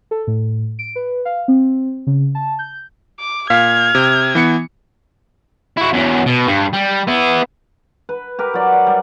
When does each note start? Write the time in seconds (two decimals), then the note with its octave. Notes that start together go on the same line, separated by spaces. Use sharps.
0.11 A4
0.27 A2
0.79 D7
0.96 B4
1.25 F5
1.48 C4
2.07 C#3
2.35 A5
2.59 G6
3.19 D6
3.50 A#2 F5 F6 G#6 B6
3.95 C3
4.35 E3 B3 C#7
5.77 E4 F#4
5.93 E2 F#3
6.26 B2
6.47 G2
6.73 G3
7.07 B3 E4
8.09 B4
8.39 G4 A#4 B4
8.54 F#3 D5
8.73 D5
8.86 G3